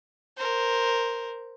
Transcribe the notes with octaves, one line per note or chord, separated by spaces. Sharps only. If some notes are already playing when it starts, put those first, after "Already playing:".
A#4 C5